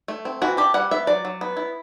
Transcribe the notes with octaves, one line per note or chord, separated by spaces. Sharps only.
A3
C4
E3 F#4
D4 G4
G3 F#5
B3 E5
F#3 D5
F#3
B3
E4